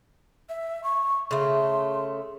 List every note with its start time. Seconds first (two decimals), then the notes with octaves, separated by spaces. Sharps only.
0.49 E5
0.83 C#6
1.31 C#3 A3 C6